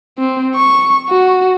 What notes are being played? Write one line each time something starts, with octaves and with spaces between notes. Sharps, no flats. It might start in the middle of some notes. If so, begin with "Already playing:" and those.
C4
C#6
F#4